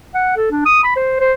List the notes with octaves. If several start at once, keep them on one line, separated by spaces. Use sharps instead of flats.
F#5
A4
D4
D#6
B5
C5
C5